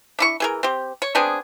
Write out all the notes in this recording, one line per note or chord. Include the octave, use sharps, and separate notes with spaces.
D4 E4 C#6
E3 G#4 A#4
C4 G4
C#5
B3 C4 D4 G#4